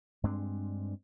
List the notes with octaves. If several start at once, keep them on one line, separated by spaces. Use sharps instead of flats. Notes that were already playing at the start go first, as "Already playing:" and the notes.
G2 G#3 C4 D4